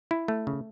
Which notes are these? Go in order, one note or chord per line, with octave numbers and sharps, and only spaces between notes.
E4
A3
C#3